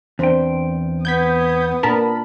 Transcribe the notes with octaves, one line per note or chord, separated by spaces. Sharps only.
E2 C4 D4 C5 G5
B3 D#6 G6 G#6 B6
A#2 D4 A#4 A5 B5